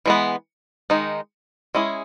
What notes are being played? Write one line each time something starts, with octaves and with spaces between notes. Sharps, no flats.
E3 G#3 B3
D#3 G#3 D#4
G#3 C#4 E4 G#4